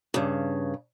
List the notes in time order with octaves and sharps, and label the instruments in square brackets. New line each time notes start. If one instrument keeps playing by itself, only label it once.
[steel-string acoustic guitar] G2 C#3